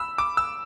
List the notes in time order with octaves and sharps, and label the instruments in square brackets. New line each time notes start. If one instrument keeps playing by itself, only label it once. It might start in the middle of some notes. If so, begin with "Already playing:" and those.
Already playing: [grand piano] B5 E6
D6
E6